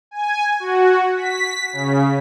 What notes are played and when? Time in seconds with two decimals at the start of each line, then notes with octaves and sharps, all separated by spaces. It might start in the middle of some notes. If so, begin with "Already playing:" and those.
0.11 G#5
0.60 F#4
1.17 B6
1.73 C#3